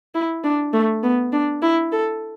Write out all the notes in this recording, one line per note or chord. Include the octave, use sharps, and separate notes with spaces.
E4
D4
A3
B3
D4
E4
A4